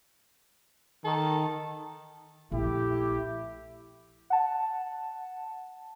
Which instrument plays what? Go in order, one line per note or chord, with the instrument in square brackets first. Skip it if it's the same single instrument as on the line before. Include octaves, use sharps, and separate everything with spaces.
[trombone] D#3 [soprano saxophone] A4
[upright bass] A#1 B3 [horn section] A3 E4 G4
[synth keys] F#5 A5